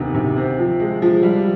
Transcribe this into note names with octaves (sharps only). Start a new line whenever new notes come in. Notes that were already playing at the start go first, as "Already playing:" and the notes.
Already playing: D2 C3 D#3 B3
C3
C4
F3
G#3
F3
G3